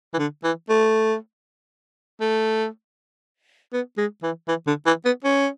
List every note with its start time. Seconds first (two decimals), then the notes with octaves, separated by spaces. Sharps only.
0.14 E3
0.19 D3
0.44 E3
0.70 A3
2.21 A3
3.73 B3
3.98 G#3
4.23 E3
4.48 E3
4.67 D3
4.86 E3
5.05 B3
5.25 C#4